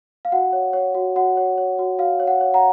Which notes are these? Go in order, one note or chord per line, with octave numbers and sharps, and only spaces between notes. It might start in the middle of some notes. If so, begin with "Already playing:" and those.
F5
F#4 F#5
C#5
C#5
F#4
F#4 F#5
C#5
C#5
F#4
F#4 F5
C#5
F#5
C#5
F#5 A#5